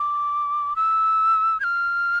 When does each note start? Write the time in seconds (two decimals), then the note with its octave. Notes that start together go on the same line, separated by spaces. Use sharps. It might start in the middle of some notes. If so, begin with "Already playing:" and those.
Already playing: D6
0.76 E6
1.60 G#6
1.64 F6